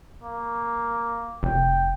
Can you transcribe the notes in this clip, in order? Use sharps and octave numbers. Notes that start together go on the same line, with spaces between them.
A#3
F1 G5